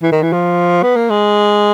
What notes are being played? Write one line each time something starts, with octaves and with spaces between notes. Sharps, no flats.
E3
D#3
E3
F3
B3
A#3
G#3